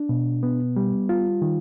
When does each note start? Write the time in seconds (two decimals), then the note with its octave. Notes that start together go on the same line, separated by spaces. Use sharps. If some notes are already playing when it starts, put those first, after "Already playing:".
Already playing: D4
0.09 B2
0.43 B3
0.76 G3
1.09 F4
1.42 D#3